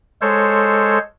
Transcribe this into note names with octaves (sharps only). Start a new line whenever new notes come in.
G#3 A4 C5 C#5